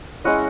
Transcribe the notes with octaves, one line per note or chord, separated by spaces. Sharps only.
G#3 C#4 E4 D#5 F#5